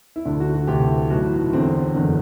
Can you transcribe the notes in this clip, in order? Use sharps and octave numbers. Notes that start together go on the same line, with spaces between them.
E4
D2 D3 D4
F#4
F#4
D2 C3 E3 G4
B1 A2 E3 F#4
E1 E2 D3 C4
F#1 E2 D3